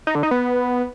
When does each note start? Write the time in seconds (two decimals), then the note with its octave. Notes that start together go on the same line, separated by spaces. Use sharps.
0.07 D#4
0.15 D3
0.23 D#4
0.31 B3